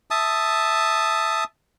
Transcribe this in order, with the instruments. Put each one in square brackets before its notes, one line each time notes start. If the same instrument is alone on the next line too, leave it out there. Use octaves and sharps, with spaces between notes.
[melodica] E5 A5 D#6